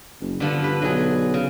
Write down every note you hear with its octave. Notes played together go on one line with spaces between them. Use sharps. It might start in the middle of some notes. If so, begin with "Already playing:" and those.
F#1
G2 D3 F3 B3
G2 D4 B4
B1 F#3 G#4
C#3